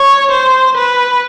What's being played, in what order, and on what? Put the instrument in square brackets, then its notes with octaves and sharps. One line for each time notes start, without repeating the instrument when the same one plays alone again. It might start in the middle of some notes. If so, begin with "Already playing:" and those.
Already playing: [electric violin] C#5
C5
B4